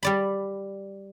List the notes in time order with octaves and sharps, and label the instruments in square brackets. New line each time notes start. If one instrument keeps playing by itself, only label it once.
[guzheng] G3 D5 B5